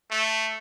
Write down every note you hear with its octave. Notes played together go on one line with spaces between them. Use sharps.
A3